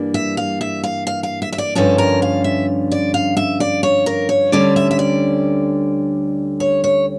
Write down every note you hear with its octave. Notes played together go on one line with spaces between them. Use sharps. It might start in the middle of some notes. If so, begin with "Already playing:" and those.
Already playing: G2 E3 G3 A#3 D4
E5
F5
E5
F5
F5
F5
E5
E5
D5
G2 D3 F3 C#4 A4
A#4
F5
E5
D5
F5
E5
D5
C#5
A#4
C#5
D2 D3 G3 C#4 D5
E5
E5
D5
C#5
C#5